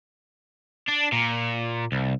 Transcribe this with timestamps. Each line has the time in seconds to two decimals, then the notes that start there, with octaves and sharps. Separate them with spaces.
0.88 D4
1.12 A#2
1.92 C2